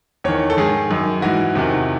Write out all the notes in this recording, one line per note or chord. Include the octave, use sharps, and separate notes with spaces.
E2 D#3 C#5
A4
G#2 D#3 G#4
F#2 D#3
G#2 E3 F#4
E2 C3 D#3